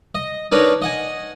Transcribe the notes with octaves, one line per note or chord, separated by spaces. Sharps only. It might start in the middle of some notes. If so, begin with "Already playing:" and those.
D#5
D4 D#4 A#4 B4 C#5
D#5 F#5 G#5